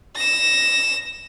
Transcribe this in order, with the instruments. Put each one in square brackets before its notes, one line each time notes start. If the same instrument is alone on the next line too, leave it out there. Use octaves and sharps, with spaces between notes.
[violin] A#6 E7